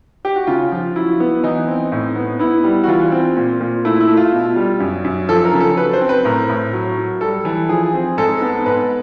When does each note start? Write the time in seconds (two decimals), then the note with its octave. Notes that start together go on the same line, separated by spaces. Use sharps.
0.25 G4
0.36 F#4
0.47 C#3 F4
0.72 F3
0.96 F#3 E4
1.20 B3
1.44 E3 D#4
1.67 C4
1.92 A2
2.16 B3
2.39 B3 E4
2.64 G3
2.84 F#4
2.88 E3 F4
3.12 C4
3.37 A#2
3.61 A#2
3.85 A3 E4
4.00 E4
4.08 A3
4.17 F4
4.32 B2
4.56 G3
4.80 F#2
5.04 F#2
5.29 F3 A4
5.45 A#4
5.53 C#3
5.60 A4
5.77 F#3 B4
5.93 C5
6.01 C4
6.09 B4
6.25 A2 A#4
6.49 A2
6.73 F#3
6.97 F#3
7.21 G3 A4
7.45 E3
7.69 F3 G#4
7.94 C4
8.18 G#2 A4
8.42 B3
8.66 G#2 B4